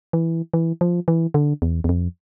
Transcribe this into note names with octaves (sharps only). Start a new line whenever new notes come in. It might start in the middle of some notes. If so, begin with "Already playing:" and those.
E3
E3
F3
E3
D3
E2
E2
F2